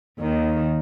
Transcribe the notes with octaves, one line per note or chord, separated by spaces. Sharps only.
D#2 D#3